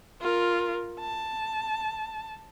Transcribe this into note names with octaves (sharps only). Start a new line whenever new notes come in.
F4 A#4
A5